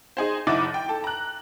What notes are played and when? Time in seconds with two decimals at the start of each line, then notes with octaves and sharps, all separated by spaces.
0.17 D#4 G#4 C5
0.47 F#1 D#4 E4 F#5 D6 A6
0.74 G5
0.89 A4
1.04 A#5 F#6